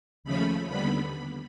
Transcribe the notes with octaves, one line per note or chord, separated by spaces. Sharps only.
D#2 C#3 F3 A3 C#4 B5
D#2 D3 G3 B3 B5